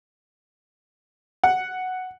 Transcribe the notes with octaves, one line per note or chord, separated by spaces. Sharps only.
F#5